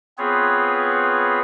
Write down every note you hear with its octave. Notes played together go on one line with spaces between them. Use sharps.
B3 C4 F4 G#4 B4 C#5